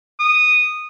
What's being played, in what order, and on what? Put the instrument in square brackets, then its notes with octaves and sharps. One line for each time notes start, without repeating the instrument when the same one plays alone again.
[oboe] D#6